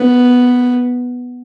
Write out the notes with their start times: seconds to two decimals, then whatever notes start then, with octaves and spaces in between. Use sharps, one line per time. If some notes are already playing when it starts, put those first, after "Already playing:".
Already playing: B3